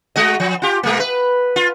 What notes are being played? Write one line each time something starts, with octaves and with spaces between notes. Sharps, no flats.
G#3 F#4 D#5
F3
F4 G4
B2 G#3 A#3
B4
F4